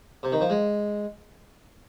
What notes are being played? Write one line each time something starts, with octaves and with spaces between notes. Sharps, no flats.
C3
D#3
F3
G#3